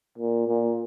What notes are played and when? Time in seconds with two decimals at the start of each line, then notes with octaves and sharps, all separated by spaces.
0.18 A#2
0.47 A#2